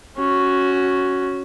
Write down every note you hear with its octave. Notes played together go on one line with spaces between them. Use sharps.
C#4 F#4